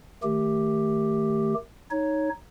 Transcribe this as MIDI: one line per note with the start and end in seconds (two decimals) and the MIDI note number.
0.23 1.54 51
0.23 1.54 57
0.23 1.54 67
1.91 2.29 63
1.91 2.29 73